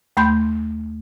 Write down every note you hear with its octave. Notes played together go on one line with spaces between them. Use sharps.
D#2 A3 B5 C6 G6